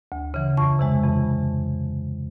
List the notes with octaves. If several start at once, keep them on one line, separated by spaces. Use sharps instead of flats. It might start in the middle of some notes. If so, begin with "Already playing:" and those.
D2
C#3 E3
F2 C#6
C3 E3 G#3
F2